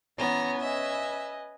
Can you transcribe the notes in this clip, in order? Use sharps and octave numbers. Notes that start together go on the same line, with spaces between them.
E3 B3 C#4 A5 A#5
B4 D#5 E5 G#5